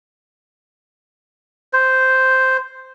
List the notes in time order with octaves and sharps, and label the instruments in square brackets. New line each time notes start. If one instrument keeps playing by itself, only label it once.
[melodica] C5